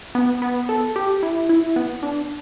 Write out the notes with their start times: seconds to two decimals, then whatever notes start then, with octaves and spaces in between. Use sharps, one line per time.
0.15 B3
0.42 B3
0.69 A4
0.96 G4
1.23 E4
1.49 E4
1.76 B3
2.03 D4